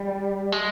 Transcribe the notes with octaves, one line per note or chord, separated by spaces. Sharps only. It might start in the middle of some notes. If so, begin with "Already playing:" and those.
Already playing: G3
G#3